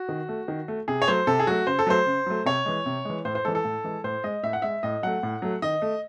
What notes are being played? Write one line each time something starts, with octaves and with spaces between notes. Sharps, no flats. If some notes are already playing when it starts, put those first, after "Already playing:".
Already playing: F#4
D#3
A3
D#3
A3
C3 G#4
C#5
F#3 A3 C5
C3 A4
G#4
F#3 A3 F#4
C#3 C5
A4
F#3 A3 C5
C#3
F#3 A3
C3 C#5
E3 G#3
C3
E3 G#3
A2 C5
C5
E3 G#3 A4
A4
A2
E3 G#3
A2 C5
G#3 D#5
A2 E5
F#5
G#3 E5
A2 D#5
F#3 A3 F#5
A2
F#3 A3
D#3 D#5
A3